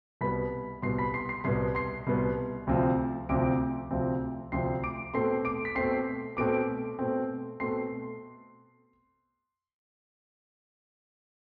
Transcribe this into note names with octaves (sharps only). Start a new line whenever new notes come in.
C2 B2 B3 B5 B6
C2 B2 B3 C6 C7
B5 B6
C6 C7
C6 C7
C2 B2 B3 C6 C7
C6 C7
C2 B2 B3
D2 C3 F3 C4
D2 C3 F3 C4 D6 D7
D2 C3 F3 C4
D2 C3 F3 C4 C6 C7
D6 D7
B2 A3 C4 C6 C7
D6 D7
B6
B2 A3 C4 C6 C7
B2 A3 C4 D6 D7
B2 A3 C4
B2 A3 C4 C6 C7